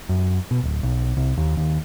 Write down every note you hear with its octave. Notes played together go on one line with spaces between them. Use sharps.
F#2
B2
D1
B1
C2
D#2
D#2